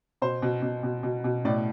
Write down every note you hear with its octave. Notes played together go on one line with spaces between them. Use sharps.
B2 C5
B2
B2
B2
B2
B2
A2 D5